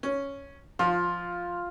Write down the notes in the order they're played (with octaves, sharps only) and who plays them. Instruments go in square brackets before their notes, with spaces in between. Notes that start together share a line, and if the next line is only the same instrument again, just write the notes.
[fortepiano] C#4
[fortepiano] F3 [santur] F4